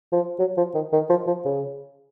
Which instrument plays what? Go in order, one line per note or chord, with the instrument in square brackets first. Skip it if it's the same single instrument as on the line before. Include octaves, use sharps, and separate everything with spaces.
[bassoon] F3
F#3
F3
D#3
D#3
F3
F3
C#3